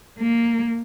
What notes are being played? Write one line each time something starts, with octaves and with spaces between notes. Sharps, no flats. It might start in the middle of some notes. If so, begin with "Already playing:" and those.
A#3